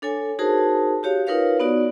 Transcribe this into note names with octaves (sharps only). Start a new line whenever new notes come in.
D4 A4 C#5 G#5
D#4 F#4 G#4 A#4 C5 A5
F#4 G4 C#5 F5
D#4 F4 A#4 B4 C#5 F5
B3 D#4 F#4 D5